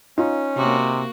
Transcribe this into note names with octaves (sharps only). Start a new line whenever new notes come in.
C#4 D#4 F4
C3 A#3 F#4